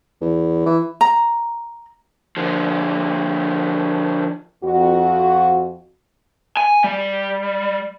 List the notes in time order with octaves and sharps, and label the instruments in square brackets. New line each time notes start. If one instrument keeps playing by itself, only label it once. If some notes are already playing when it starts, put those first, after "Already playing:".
[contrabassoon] E2
E3
[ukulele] A#5
[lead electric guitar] D3 F3
[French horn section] F2 F#4
[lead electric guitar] G#5
G3